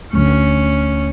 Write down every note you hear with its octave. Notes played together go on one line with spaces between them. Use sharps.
D2 C#4